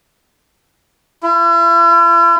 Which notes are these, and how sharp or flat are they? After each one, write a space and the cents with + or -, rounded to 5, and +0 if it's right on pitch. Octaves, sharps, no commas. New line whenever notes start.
E4 +45